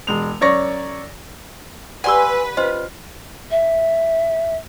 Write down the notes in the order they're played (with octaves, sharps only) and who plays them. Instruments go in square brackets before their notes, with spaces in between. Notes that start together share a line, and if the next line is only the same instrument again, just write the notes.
[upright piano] E1 G#3 F7
F#2 C#5 D5 C#6 A#6
[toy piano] G4 D5 F#5 [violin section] B4 [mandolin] G#5 C6 E6
[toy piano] C#4 C5 D#5 [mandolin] F4
[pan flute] E5